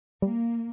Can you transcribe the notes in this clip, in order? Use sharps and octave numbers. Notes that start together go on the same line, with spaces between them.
G3 A#3